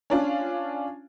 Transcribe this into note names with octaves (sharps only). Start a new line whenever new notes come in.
C#4 D4 F4